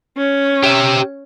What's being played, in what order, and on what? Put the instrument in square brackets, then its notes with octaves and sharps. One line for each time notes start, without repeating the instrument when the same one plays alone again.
[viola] C#4
[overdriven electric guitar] G4 E5